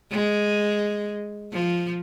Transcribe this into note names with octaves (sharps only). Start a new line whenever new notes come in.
G#3
F3